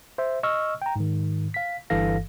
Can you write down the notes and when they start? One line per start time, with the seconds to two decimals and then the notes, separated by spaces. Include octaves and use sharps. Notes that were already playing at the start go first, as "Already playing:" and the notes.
0.18 C5 E5
0.43 D#5 C#6 E6 F6
0.82 G5 A#5
0.96 G#2 D#3
1.54 F5 B6
1.90 G1 G2 E3 A4 F5 A#6